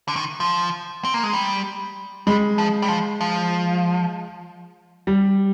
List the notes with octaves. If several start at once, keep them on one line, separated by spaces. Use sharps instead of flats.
D3
D#3
F3
C4
A#3
G#3
G3
G3 G#3
F3
G3
F3
F3
G3